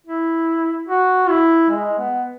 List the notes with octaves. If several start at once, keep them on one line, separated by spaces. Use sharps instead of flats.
E4
F#4
E4
G#3
B3